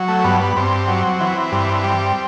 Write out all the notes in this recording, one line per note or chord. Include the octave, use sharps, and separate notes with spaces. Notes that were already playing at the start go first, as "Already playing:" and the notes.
Already playing: F#3
A3
G2 B3
B3
G2 C4
F#3
E3
G2
G3